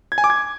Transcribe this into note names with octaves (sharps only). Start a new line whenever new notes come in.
G#6
G#5
D6
G#6